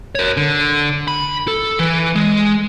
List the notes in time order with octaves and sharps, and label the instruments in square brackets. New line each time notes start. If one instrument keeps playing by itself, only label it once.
[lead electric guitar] A#4 C#5
D3
B5
A4
E3
G#3